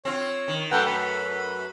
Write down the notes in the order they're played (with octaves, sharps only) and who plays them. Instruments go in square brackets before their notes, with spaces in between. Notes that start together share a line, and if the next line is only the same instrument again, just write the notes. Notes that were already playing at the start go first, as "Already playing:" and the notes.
[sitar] C4 F4 [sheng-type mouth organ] C#5
[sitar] D#3
[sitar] F#2 A3 [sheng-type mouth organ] B4 F#5 G5
[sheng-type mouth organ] B4 B5